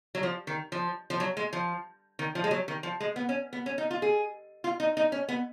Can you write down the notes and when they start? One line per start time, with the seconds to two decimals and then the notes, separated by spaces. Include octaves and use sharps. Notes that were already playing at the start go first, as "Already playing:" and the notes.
0.15 F#3
0.23 F3
0.47 D#3
0.72 F3
1.10 F3
1.20 F#3
1.37 G#3
1.53 F3
2.19 D#3
2.35 F3
2.44 G#3
2.51 F#3
2.68 D#3
2.83 F3
3.00 G#3
3.16 B3
3.29 C#4
3.53 B3
3.66 C#4
3.78 D#4
3.91 F4
4.02 G#4
4.64 F4
4.80 D#4
4.97 D#4
5.12 C#4
5.28 B3